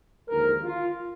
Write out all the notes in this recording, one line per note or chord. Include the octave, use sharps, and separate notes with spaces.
D#2 D3 F3 G#3 A#4
F4